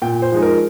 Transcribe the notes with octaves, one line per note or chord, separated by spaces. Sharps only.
A#2 G5
C5
F3 G#3 D#4
A#4